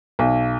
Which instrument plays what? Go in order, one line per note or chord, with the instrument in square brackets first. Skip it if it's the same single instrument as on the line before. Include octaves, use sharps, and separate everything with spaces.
[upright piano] B1